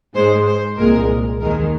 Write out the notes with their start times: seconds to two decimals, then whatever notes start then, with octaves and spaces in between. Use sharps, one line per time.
0.14 G#2 G#3 C5
0.47 C5
0.77 C2 A#2 G#3 A#4
1.40 D#2 D#3 G#3 A#4